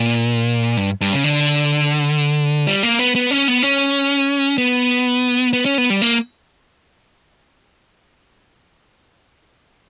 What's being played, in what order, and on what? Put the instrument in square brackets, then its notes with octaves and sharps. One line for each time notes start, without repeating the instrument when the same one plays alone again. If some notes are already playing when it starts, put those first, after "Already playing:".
Already playing: [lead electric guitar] A#2
G2
G2
C#3
D3
G3
A#3
B3
B3
C#4
B3
C#4
B3
B3
C#4
B3
G3
A#3